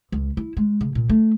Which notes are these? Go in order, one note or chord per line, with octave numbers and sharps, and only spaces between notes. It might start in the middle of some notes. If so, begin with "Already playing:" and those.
C#2
E4
G#3
C#3
A#2
A3